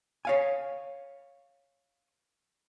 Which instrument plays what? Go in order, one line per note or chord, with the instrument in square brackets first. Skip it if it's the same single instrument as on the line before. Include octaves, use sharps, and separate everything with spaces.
[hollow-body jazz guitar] C#5 F5 G#5